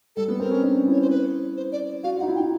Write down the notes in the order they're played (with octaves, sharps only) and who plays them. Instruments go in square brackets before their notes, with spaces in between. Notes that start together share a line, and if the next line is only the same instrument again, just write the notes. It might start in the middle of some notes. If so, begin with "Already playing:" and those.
[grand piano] G3 [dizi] A4
[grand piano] B3
[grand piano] C4 [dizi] A#4
[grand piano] C#4
D4
E4
[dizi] C#5
C5
B4
C5
D5
[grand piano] F#4 [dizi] F5
[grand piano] F4
[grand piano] D#4 [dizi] F#5
[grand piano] E4
[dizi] G5
[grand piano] D#4